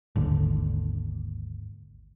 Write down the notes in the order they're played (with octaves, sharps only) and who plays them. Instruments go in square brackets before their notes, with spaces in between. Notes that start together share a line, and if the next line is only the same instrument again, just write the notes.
[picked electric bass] G#1 D#2 D3